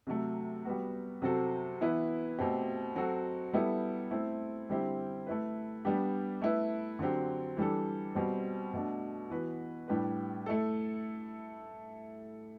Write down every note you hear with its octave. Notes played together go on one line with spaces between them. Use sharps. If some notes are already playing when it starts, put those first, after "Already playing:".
C3 F#3 A3
G3 B3 F#4
C3 F#3 C4 F#4 A4
E3 B3 E4 B4
B2 A3 C4 G4
F#3 C4 F#4 A4
G3 B3 E4 A4
A3 C4 E4
D3 G3 C4 E4 G4
A3 E4 B4
G3 B3 D4 G4
A3 E4 B4
D3 F#3 C4 G4
E3 G3 D4 A4
B2 G3 C4
B2 A3 D4
E3 B3 F#4 B4
A2 G3 D4 G4 B4
A3 E4 A4